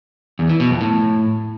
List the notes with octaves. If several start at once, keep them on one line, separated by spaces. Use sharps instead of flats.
E2
E3
B2
F2
A2